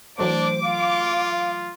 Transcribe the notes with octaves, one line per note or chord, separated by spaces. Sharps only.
E3 F#3 A3 D4 C5 D6
F4 F5